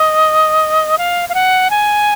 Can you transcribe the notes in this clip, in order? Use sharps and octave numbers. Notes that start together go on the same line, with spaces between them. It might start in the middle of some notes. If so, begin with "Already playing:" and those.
Already playing: D#5
F5
F5
F#5
G#5